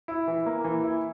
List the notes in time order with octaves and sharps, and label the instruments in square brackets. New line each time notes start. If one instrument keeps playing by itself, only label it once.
[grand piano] E4
E3
A#3
E3
E4